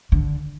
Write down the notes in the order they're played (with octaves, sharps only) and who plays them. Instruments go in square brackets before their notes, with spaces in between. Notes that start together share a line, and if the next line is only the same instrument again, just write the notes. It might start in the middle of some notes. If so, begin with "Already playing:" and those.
[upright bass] D3